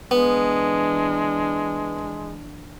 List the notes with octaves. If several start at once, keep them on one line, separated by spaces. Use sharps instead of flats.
E3 G#3 B3 D4